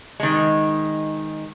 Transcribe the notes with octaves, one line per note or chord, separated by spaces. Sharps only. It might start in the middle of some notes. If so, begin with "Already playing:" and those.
D#3 G#3